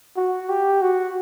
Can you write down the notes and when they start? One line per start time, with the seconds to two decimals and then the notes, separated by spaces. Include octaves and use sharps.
0.17 F#4
0.49 G4
0.82 F#4